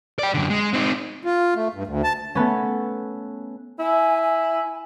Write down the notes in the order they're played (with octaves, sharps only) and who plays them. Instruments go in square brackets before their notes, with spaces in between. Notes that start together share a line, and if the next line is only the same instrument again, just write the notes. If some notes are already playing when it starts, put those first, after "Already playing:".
[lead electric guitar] D5 G5
F#2 D3
G#3
C4 D#4
[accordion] F4
A3
G2
D2
A5
[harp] A3 B3 C#4
[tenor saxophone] E4 [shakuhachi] G#5
[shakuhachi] G#5